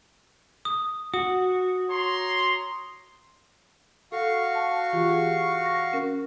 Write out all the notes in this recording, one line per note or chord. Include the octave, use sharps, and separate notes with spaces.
D#6
F#4 D#6
C#5 A#5 C6
F#4 A4 F5 C#6
A5
E3 F4 G4
G#4
A#6
C#4 A#4